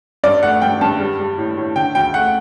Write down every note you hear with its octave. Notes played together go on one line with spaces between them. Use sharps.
G2 D5
A3 F#5
G2 G5
G2 A5
G3
G3
A2
A2
D3 G5
D2 G5
A3 F#5